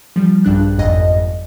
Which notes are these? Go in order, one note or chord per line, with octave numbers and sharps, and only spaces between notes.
F3 G3
A#1 G2 D4 F#6
G1 F2 G#2 D5 D#5 A#6